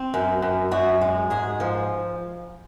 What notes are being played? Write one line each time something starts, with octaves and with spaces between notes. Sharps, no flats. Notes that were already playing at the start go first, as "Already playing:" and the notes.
Already playing: C4
F#2
F#2
F#2 F#4
G#3
G#2 G#4
F3